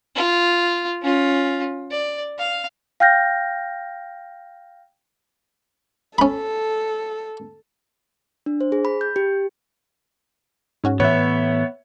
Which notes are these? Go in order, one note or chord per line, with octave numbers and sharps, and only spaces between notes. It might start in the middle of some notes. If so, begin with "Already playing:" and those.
F4
C#4 F4
D5
F5
F5 G5 F6 G6 A#6
C#4 A4 B5
D4
C5
G#4
B5
G6
G4
G#2 C#4 F#4
A2 E3 B3 B4 C#5 E5